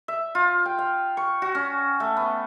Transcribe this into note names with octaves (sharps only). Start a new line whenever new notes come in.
E5
F4
G5
F5
C#6
F#4
C#4
A3
B3